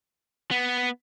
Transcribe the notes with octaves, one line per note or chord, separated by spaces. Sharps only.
B3